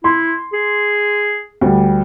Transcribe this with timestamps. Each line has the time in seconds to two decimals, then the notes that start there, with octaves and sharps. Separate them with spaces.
0.04 E4 C6
0.53 G#4
1.61 D2 G3